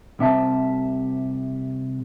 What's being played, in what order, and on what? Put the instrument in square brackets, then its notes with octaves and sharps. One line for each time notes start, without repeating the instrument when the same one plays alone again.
[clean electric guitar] C2 C3 E5 A5